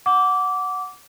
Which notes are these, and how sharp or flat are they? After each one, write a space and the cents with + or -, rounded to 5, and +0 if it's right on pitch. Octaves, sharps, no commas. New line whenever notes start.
F#5 -5 D6 -20